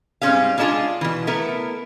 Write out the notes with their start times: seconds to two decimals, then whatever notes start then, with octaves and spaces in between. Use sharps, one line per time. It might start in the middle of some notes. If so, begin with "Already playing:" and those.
0.22 G#2 G3 C4 C#4 G#4 F5
0.58 F#3 G#3 D4 E4 F4 G#4
1.01 B2 E3
1.27 A3 B3 E4 A#4